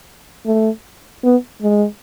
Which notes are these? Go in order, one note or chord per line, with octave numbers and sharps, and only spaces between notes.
A3
B3
G#3